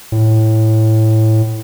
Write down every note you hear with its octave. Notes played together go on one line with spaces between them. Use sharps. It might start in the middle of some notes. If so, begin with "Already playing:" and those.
A2